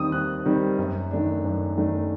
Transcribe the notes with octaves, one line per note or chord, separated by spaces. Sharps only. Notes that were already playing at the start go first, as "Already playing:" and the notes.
Already playing: D#2 D#3 G3 C4 D#6
D#2 F#6
D#3 G3 C4
F#2
D#3 A3 D4
F#2
D#3 A3 D4